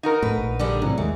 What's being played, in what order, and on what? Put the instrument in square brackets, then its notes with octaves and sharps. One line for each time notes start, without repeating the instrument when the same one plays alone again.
[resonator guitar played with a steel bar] D#4 F#4 A#4
[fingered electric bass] A2 [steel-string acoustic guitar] B4
[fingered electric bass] A#1
[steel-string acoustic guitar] D3 G3 G#4
[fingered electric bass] A2 C3 E3 [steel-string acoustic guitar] F#3
[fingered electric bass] D#2 D#3 G#3 [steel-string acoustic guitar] E3